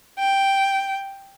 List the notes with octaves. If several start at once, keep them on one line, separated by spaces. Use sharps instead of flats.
G5